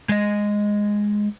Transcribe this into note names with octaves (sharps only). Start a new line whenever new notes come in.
G#3 D#5